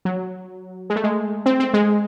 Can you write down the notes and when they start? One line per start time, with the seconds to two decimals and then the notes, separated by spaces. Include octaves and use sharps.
0.05 F#3
0.90 G#3
0.96 A3
1.04 G#3
1.46 C4
1.60 C4
1.74 G#3